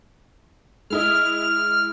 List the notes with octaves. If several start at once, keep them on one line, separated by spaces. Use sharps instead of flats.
G#3 E4 D#5 F6